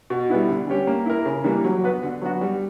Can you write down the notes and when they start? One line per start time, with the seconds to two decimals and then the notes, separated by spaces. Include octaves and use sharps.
0.10 B2
0.29 G3 B3 E4
0.49 D3
0.67 G3 C#4 G4
0.87 A#3
1.06 E4 A#4
1.26 C#3
1.44 E3 G3 A#3 D4
1.64 F#3
1.84 B3 F#4 B4
2.03 D3
2.22 F#3 B3 F#4
2.41 G3